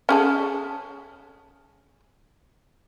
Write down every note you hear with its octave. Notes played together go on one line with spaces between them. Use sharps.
C#4 G#4 A4